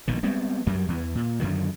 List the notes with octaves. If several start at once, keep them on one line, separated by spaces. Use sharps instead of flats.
A#1 B2 D#3
G3 G#3 B3 C4
F#2 F#3 G3
E2 E3
A#2
F#2 D3 D#3 F#3